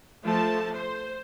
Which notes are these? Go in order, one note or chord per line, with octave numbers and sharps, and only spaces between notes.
F3 A3 A5
C5